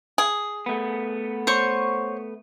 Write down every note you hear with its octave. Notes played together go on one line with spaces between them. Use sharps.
G#4
A3 B3
C5 C#5 C#6